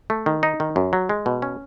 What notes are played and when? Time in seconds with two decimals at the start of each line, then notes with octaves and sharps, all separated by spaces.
0.10 A3
0.26 D#3
0.43 D#4
0.60 D#3
0.76 F#2
0.93 F#3
1.09 G#3
1.26 B2
1.42 C#4